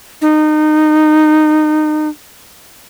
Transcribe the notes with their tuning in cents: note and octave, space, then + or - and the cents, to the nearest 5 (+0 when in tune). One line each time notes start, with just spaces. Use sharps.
D#4 -25